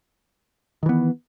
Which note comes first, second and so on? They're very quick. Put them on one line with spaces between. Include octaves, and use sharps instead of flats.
D#3 E3 B3